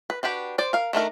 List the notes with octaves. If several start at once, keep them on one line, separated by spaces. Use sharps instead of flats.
B4
D4 F#4 G4 B4
C5 D5
A#4 F5
D#3 A3 D4 A#4